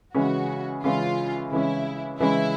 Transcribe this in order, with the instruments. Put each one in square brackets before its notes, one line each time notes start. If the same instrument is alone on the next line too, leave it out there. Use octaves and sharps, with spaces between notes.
[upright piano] C#3 E3 G#3 C#4 [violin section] F#4
[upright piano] C#3 E3 G#3 C#4 [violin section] F4
[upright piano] C#3 E3 G#3 C#4 [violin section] E4
[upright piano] C#3 E3 G#3 C#4 [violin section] E4